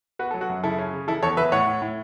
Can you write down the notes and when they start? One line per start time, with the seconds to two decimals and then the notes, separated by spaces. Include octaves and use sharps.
0.19 B3 F#4 B4
0.31 F#3 A4
0.41 F#4
0.50 F#2
0.63 C#3 E4 A4
0.79 C#4
0.93 C#3
1.08 E3 E4 A4
1.23 E2 A4 C#5
1.37 E2 B4 E5
1.52 A2 C#5 F#5
1.67 A2
1.82 A2